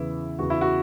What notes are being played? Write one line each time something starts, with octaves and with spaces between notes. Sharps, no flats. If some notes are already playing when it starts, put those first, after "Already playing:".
Already playing: E2 C#3 E3 E4
E2 C#3 E3 F#4
E4
F#4